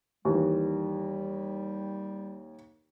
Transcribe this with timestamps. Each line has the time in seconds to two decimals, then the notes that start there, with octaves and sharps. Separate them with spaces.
0.25 D#2 E3 G3